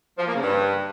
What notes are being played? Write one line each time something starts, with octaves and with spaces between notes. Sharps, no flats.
F3
A#3
C#3
G2